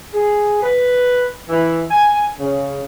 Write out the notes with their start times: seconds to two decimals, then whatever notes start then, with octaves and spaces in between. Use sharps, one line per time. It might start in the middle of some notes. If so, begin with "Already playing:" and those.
0.14 G#4
0.63 B4
1.49 E3
1.91 G#5
2.40 C#3